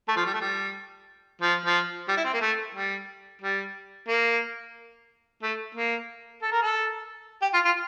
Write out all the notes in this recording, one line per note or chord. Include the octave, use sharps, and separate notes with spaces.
A3
F3
G3
A3
G3
F3
F3
G3
E4
C4
A#3
A3
G3
G3
A#3
A3
A#3
A4
A#4
A4
G4
F4
F4